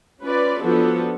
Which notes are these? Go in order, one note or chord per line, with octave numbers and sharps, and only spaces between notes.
C#4 F4 B4 D5
F3 B3 D4 F#4 A4